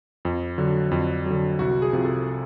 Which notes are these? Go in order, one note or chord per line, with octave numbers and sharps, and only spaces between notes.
F2
D3 F#3
F2
D3 F#3
C2 F#4
G#4
C3 F3
A4